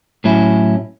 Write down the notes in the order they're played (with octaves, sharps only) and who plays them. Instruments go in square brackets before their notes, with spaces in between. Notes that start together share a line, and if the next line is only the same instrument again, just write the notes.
[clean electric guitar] A2 F#3 C#4 E4